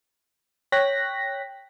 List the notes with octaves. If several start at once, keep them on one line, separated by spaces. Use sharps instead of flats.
C#5 G5 F#6 A#6 B6